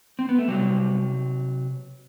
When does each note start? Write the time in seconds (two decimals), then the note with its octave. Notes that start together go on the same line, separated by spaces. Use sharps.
0.19 C4
0.29 B3
0.39 A3
0.48 C3 F#3 G3